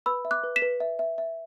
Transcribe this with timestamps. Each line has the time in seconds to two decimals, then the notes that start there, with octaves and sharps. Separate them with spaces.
0.06 B4 B5 E6
0.25 E5
0.31 D6 F#6
0.44 B4
0.56 B6 E7
0.62 B4
0.80 E5
0.99 E5
1.18 E5